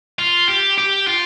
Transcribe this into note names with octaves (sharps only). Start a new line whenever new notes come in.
F4
G4
G4
F4